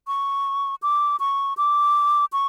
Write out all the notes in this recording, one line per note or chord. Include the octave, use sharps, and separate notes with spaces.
C#6
D6
C#6
D6
C#6